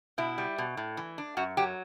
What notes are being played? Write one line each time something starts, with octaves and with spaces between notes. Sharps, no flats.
B2 E4
G3
B2
A2
E3
D4
F#2 F#4
F#3 G4